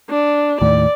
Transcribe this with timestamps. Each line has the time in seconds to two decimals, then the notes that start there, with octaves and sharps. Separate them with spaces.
0.10 D4
0.61 D#2 A2 D5